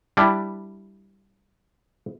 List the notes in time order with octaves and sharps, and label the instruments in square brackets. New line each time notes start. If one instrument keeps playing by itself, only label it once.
[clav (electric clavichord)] G3 D4 E4